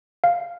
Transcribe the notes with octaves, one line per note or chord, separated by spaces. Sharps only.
F5